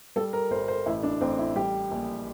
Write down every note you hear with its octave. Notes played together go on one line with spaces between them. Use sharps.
G3 A4
A#4
G1 C5
C5
A1 E4
D4
A1 C4
E4
G3 G4
A#1